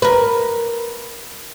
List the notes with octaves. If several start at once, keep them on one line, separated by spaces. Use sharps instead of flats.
A#4 B4